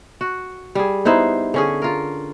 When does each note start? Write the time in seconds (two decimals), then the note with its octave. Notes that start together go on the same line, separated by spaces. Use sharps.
0.21 F#4
0.75 G3 G#4
1.05 B3 D#4 E4 C5
1.54 D3 C#4 G#4
1.82 F4 A#4